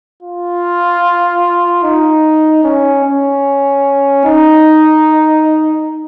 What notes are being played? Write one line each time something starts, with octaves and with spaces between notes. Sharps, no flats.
F4
D#4
C#4
C#4
D#4